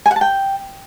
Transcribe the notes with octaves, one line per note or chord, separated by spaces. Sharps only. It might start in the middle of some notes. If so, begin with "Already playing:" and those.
G#5
F#5
A5
G5